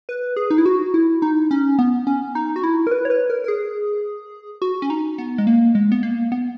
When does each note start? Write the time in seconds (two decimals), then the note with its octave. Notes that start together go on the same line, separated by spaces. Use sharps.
0.09 B4
0.36 G#4
0.51 D#4
0.58 E4
0.66 F#4
0.94 E4
1.22 D#4
1.51 C#4
1.79 B3
2.07 C#4
2.35 D#4
2.56 F#4
2.63 E4
2.87 A#4
2.91 B4
3.05 C#5
3.10 B4
3.30 A#4
3.44 A#4
3.48 G#4
4.62 F#4
4.82 C#4
4.90 D#4
5.18 B3
5.38 G#3
5.47 A#3
5.75 G#3
5.92 B3
6.03 A#3
6.32 B3